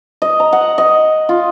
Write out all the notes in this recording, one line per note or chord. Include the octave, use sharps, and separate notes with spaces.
D#5
A#5
F#5
D#5
F4